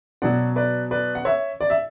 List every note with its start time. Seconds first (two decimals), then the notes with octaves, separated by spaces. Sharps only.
0.22 B2 F#3 D5 F#5
0.56 B4 D5
0.91 B4 D5
1.15 F#5
1.25 C#5 E5
1.61 D5
1.70 E5